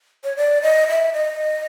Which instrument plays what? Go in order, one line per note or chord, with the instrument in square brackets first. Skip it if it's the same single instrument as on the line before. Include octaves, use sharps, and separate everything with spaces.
[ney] C#5
D5
D#5
E5
D#5